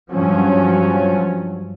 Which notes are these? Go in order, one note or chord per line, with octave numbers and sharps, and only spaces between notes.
G2 F3 F#3 C#4